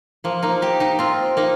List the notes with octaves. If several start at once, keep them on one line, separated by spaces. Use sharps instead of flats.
F3 A#3
A#3 D#4
D#4 G4
D#4 G4
C4 F4
A#3 D#4